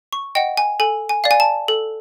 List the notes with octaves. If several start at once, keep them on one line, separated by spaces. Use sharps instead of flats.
C#6
D#5 F#5 G5
G#5
A4 G#5
G#5
D5 F5
G#5
A5
A4